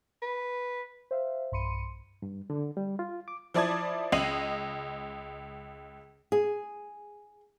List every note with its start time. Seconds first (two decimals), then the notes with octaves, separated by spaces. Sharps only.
0.22 B4
1.11 C5 E5 F5
1.52 B1 G2 B5 C6 C#7 D#7
2.22 G2
2.50 D3
2.77 G3
2.99 F4
3.28 D6
3.54 F3 E4 D5 A5 D#6 G#6
4.12 C#2 D#5 C7 D#7 F#7
6.32 G#4